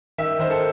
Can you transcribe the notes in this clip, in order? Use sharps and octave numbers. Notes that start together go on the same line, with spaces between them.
D#3 E5
D#3 C5
A4